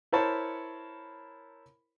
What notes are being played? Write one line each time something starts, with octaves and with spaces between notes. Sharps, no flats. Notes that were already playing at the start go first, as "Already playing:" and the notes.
E4 A#4 C5 C#5 A5 B5